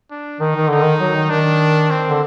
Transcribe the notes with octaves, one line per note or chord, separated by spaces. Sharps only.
D4
D#3 D#4
D#3
D3 D#4
D#3
F#3
D#3
D#3 D4
C4
D3